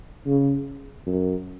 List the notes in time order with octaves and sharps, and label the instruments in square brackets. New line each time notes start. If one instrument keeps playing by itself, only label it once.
[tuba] C#3
F#2